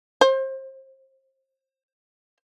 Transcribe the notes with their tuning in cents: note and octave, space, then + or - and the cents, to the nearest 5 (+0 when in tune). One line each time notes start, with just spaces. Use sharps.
C5 +30